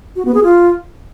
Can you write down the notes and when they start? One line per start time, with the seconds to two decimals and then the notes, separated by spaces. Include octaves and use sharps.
0.16 F#4
0.25 B3
0.34 G#4
0.44 F4